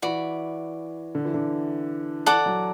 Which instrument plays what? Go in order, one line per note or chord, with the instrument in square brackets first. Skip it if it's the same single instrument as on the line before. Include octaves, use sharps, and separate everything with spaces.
[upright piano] E3 [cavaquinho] F#4 D5 B5
[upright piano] D3
E3
D3
[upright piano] E3 [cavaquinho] A4 D5 F#5 D6
[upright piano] F#3